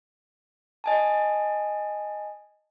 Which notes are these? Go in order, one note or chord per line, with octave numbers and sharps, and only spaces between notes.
D#5 G#5 A5